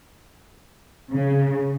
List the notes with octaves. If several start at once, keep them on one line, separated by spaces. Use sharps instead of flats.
C#3